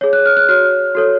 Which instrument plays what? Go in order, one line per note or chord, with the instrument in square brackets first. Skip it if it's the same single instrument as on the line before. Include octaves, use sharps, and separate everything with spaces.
[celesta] G#4 C#5
F#6
F6
F#6
F#4 C#5 F6
F#4 A4 C#5